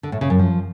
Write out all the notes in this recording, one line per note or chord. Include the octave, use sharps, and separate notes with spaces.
D3
A2
C#3
F#2
F3